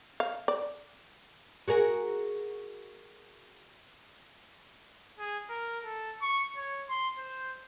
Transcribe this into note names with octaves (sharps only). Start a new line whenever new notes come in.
F5
D5
F#4 G#4 A#4
G#4
A#4
A4
C#6
C#5
C6
C5